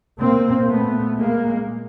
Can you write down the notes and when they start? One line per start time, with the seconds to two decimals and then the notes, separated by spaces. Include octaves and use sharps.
0.19 A#2 A#3 C4
0.68 A3 B3
1.16 G#3 A#3